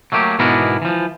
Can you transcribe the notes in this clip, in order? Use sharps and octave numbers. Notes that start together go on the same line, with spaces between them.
F#3 A3 A#3 G4
G#2 B2 E3 B3 D4 A#4
E3 F3